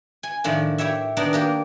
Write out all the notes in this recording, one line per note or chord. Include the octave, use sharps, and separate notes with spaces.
G#5
A2 D#3 F3 D4
E4 G4 C#5 E5
D#3 B3 D4 D#4 A#4
A#3 G4 A#4